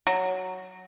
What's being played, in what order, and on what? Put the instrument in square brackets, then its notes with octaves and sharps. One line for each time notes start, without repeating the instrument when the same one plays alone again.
[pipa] F#3